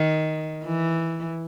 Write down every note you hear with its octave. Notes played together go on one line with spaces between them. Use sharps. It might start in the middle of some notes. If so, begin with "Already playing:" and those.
Already playing: D#3
E3